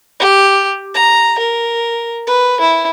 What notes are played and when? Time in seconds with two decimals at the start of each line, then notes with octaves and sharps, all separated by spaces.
0.20 G4
0.95 A#5
1.39 A#4
2.27 B4
2.61 E4